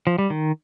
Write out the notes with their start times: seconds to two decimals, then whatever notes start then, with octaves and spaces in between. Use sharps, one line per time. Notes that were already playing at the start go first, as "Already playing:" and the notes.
0.07 F3
0.18 G3
0.30 D#3